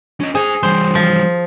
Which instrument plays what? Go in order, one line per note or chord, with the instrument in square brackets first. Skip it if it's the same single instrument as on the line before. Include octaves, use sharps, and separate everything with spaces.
[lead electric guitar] C#4 D#5
[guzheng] G#4 [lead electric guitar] C5 G#5
[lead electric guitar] E3 G3 [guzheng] C5
[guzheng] F3